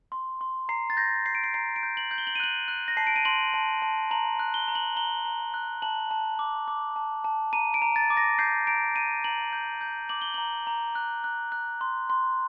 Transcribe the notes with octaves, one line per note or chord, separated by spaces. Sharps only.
C6
C6
A#5 C7
A6
G6 A#6
G6 C7
D7
C7
A#5 C7
D7
G6
F#7
G6
G7
F#7
D#7
F#6 F#7
F#6
A#6
A5 C7
D7
D#7
C6 F#7
A5
A5
A#5 F#7
F#6
G7
A#5
F#7
A#5 G7
A#5
F#6
A5 F#7
A5
D6
D6
A5
A5
A#5 D#7
D7
A#5
A6
D6
A#6
G6 C7
A#5 D7
A#5 D#7
A#5 F#7
G6
G6
D6 F#7
G7
A#5 F#7
A#5
F#6
F#6
F#6
C6
C6